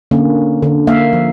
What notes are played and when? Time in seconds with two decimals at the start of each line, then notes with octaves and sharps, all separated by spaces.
0.11 D3 A#3 C#4
0.62 D3
0.87 A#3 E5 F5
1.13 F3